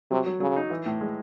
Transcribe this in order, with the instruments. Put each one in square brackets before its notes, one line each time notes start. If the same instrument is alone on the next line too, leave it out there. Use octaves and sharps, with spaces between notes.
[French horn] C3 [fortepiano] F#3
[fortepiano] F#3
[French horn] C#3 [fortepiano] F#3
[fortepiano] D#4
E3
A2
G#3